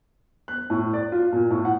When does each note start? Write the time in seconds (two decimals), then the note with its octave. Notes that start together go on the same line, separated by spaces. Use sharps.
0.48 F#6
0.70 A2
0.94 D5
1.12 F4
1.32 A#2
1.51 A2
1.65 F#5